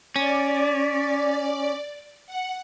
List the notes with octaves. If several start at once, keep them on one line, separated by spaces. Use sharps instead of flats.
C#4 D5
F#5